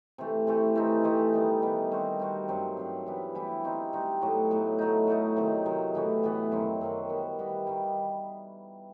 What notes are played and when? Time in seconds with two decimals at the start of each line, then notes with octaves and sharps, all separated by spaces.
0.18 C3 E3 A3
0.47 C3 E3 A3
0.75 E3 A3 C4 D#4
1.04 E3 A3 C4 D#4
1.33 D#3 G3 B3
1.62 D#3 G3 B3
1.91 G3 C4 F#4
2.20 G3 C4 F#4
2.48 G2 F#3 C4
2.77 G2 F#3 C4
3.06 E3 G3 B3 E4
3.35 E3 G3 B3 E4
3.64 G3 C4 D#4 F#4
3.93 G3 C4 D#4 F#4
4.21 A2 F#3 B3 F#4
4.51 A2 F#3 B3 F#4
4.79 F#3 A3 D#4
5.07 F#3 A3 D#4
5.36 C3 D#3 F#3
5.66 C3 D#3 F#3
5.94 A2 E3 B3 F#4
6.23 A2 E3 B3 F#4
6.52 F#2 D#3 F#3 C4
6.81 F#2 D#3 F#3 C4
7.09 G3 B3 F#4
7.39 G3 B3 F#4
7.67 D#3 G3